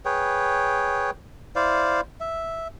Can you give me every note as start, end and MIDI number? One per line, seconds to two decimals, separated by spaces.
0.05 1.11 68
0.05 1.11 71
0.05 1.11 73
0.05 1.11 79
1.56 2.01 64
1.56 2.01 72
1.56 2.01 74
1.56 2.01 77
2.20 2.68 76